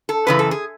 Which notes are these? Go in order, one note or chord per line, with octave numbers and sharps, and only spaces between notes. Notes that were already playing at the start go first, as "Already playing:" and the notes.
A4
F#2 C#3 E3 B4
A4
G#4